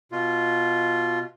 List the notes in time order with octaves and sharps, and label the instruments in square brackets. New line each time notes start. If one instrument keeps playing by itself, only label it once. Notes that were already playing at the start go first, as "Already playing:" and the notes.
[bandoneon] B2 F4